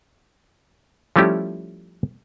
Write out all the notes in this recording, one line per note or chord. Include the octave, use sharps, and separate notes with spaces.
F3 G3 A3 C#4 E4 G4